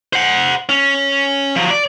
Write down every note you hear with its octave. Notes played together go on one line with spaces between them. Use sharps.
C5 F#5
C#4
F3 F#3
D5